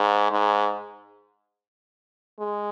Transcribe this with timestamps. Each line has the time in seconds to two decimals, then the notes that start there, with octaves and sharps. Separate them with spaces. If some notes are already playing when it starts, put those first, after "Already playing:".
Already playing: G#2
0.31 G#2
2.39 G#3